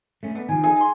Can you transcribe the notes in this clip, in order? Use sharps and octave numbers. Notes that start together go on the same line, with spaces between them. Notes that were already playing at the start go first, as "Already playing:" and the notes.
A3 C#4
B3 D4
D#3 F3 G#5
D#4 G#4 G#5
G#4 C6